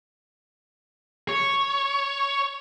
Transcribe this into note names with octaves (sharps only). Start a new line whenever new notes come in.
C#5